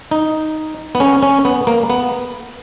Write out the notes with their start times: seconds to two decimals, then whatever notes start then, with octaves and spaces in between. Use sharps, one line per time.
0.11 D#4
0.95 B3
1.00 C#4
1.22 C#4
1.45 B3
1.67 A#3
1.90 B3